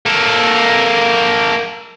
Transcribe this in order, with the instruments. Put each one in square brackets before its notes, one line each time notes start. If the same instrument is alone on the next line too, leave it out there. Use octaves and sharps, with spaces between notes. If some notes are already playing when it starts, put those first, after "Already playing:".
[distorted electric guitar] A#3 A4